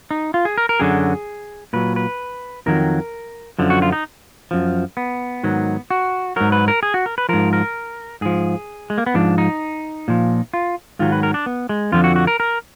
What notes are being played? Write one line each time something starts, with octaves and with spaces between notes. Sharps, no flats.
D#4
F4
G#4
A#4
A#4
F#2 D3 F#3 G#4
A#2 F#3 B4
B4
F2 D#3 F#3 A#4
F#2 D3 F3
F#4
F4
D#4
F#2 F3
B3
G#2 D#3 F#3
F#4
G#2 F#3 A#4
B4
A#4
G#4
F#4
A#4
B4
G#2 F3 A#4
A#4
G#2 F3 G#4
G#3
A#3
B3
G#2 F3 D4
D#4
A#2 F3
F4
G#2 D#3 F#3 F4
B4
A#4
D4
B3
G#3
F2 D3 F3 F4
F#4
F#4
A#4
A#4